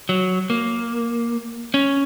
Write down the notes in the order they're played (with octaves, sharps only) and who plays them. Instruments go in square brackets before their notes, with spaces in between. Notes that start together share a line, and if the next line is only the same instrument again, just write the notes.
[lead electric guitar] F#3
A#3
C#4